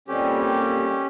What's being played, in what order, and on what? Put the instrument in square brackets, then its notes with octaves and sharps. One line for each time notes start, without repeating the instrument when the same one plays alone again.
[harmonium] A#2 G3 C4 [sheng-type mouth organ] C#4 G4 [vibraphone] A4 D5 D#5